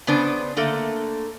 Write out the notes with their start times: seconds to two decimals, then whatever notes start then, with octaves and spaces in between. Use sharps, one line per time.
0.07 C#3 B3 D4 C5
0.57 D3 A3 A#3 A4